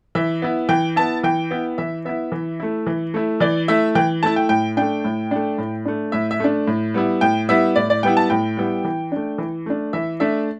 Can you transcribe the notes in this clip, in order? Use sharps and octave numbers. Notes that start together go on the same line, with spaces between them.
E3 E5
B3 E4
E3 G5
B3 E4 A5
E3 G5
B3 E4
E3 E5
B3 E4 E5
E3
A3 E4
E3
A3 E4
E3 D5
A3 E4 E5
E3 G5
A3 E4 A5
G5
A2 G5
A3 D4 G5
A2
A3 D4
A2
A3 D4
A2 E5
E5
A3 D4
A2
G3 B3 E4
A2 G5
G3 B3 E4 E5
A2 D5
D5
G3 B3 E4 G5
A5
A2 G5
G3 B3 E4
E3
A3 D4
E3
A3 D4
E3 E5
A3 D4 E5